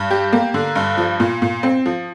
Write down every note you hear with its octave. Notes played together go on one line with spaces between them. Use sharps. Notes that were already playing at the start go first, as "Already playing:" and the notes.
Already playing: G2
G4
A#3
D3
G2
F3
A#2
A#2
C4
F3